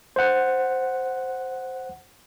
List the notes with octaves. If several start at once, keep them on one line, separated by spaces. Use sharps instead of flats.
C5 F#5